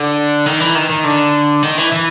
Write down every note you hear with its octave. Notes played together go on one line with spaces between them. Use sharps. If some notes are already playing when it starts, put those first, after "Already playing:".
Already playing: D3
D#3
E3
D#3
D#3
D3
D#3
E3
E3